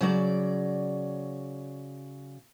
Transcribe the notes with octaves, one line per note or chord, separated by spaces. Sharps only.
C#3 F#3 D5